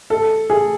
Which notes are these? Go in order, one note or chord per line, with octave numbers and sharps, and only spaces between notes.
A4
G#4